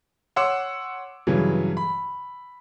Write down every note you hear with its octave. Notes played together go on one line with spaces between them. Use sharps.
C#5 F#5 C6 D6 E6
G2 C#3 E3 F#3
B5